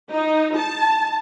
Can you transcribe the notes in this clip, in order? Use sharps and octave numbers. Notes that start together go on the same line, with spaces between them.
D#4
A5